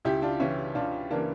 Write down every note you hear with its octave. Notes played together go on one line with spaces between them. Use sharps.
C#2 E4 G4
D4 F4
C#3 E3 C#4 E4
C#2 D4 F4
C#3 E3 A#3 D4